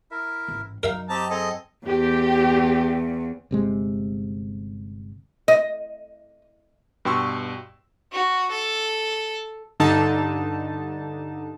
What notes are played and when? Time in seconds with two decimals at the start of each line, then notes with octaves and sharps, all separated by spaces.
0.11 E4 A#4 E5
0.48 A1 G#2
0.83 F#2 D#4 A#4 E5 F5
1.09 C4 G4 D#5 A5 A#5
1.30 C4 G#4 A4 D#5
1.86 E2 G4
3.51 G1 C3 G#3
5.48 D#5
7.05 G2 B2 G5 C6 C#6 E6
8.12 F#4
8.51 A4
9.80 G2 D3 D#4 A5